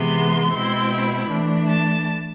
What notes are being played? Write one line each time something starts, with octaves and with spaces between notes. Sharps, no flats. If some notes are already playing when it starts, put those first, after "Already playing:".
Already playing: C3 E3 G#3 B3 C6
B2 G#3 C4 E4 C6
B5
E3 A3 D4
A5